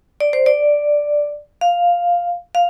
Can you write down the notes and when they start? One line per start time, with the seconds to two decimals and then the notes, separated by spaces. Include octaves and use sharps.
0.20 D5
0.33 C5
0.46 D5
1.61 F5
2.55 F5